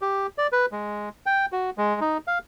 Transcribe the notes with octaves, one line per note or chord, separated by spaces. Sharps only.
G4
D5
B4
G#3
G5
F#4
G#3
D#4
F5